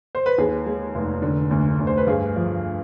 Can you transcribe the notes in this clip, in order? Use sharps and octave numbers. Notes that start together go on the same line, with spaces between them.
C5
B4
D#2 G#4
G#3
F1
D3
D2
D2
C5
B4
G2 G#4
F3